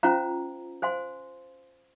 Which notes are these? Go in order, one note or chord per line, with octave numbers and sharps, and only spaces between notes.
C#4 F4 C5 F5 A#5
C5 F5 G#5 C6